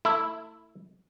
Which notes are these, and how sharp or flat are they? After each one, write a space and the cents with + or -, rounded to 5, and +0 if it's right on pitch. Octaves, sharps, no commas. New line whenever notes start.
A3 +30 E4 +0